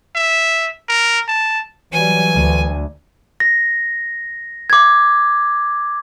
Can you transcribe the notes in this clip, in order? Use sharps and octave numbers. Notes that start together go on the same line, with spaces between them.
E5
A#4
A5
E3 F#3 G3 G#5
D2
A#6
D6 G#6